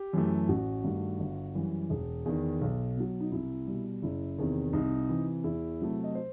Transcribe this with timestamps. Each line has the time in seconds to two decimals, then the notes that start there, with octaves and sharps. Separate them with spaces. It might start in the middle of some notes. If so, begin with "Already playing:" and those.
Already playing: G4
0.13 F#2 E3 A3
0.49 A1 F#4
0.84 G2 D#3 A3
1.20 G1
1.55 F#2 E3 G3
1.90 E1
2.26 E2 D#3
2.61 B1
2.96 B2 F#3
3.20 D#4
3.32 C2 E4
3.67 B2 G3
4.02 F#1 E4
4.38 E2 C3 D#3
4.73 C2 D#4
5.09 C3 E3
5.44 E2 E4
5.80 C3 F#3 A3
6.04 D#5
6.15 C5